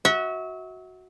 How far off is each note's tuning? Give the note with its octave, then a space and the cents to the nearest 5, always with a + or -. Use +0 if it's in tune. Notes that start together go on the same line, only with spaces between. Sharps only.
F#4 +0 E5 -35